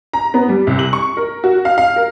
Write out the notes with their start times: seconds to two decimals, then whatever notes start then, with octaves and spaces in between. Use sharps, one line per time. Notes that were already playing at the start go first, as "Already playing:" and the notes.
0.13 A#5
0.34 B3
0.49 G3
0.67 C2
0.79 F#7
0.93 C#6
1.17 A#4
1.44 F#4
1.65 F5
1.78 F5
1.96 A#4